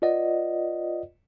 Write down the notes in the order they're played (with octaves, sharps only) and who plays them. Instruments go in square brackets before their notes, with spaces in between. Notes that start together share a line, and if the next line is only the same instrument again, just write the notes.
[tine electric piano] F4 B4 D5 D#5 F#5